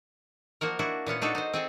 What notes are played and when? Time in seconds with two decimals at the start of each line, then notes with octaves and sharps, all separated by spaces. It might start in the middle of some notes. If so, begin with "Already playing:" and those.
0.61 F3 A#3 F#4 A#4
0.79 D4 E4 F#4
1.06 A#2 B3 C#4 F#5
1.22 D4 D#4 F#4 A4
1.35 D#4 C5
1.53 C4 G#4 A4